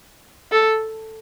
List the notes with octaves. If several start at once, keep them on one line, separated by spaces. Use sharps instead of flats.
A4